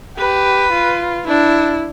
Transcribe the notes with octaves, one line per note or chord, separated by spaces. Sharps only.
G4 B4
F4
D4 E4